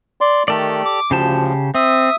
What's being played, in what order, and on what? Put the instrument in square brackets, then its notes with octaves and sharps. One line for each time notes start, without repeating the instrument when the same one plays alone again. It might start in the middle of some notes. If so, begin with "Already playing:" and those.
[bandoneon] D5 C6
[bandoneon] D#3 A3 [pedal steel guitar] G4 A4 D5
[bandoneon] D6
[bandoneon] D2 F3 [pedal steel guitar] C#3 G4 A5
[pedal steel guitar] C4 [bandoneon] E5 D#6